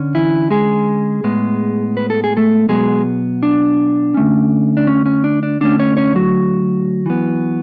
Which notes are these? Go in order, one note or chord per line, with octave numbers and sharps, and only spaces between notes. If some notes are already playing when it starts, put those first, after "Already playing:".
Already playing: D3 C#4
E3 E4
G#3 G#4
A2 G#3 B3
B4
A4
G#4
A3 A4
B2 F#3 G#3 B3 G#4
D4
D3 A3 C#4
D4
C#4
C#4
D4
D4
D3 A3 C#4 D4
C#4 C#5
C#4 C#5
F#3 F#4
E3 B3